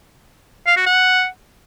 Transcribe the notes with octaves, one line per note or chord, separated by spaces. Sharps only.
F5
F#4
F#5